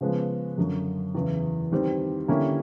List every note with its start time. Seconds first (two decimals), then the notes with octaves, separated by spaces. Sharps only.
0.01 C#3 F3 G#3 B3
0.58 F#2 D3 F#3
1.14 E2 C#3 E3
1.72 D#3 G3 C4
2.28 D3 G3 A#3 C#4 E4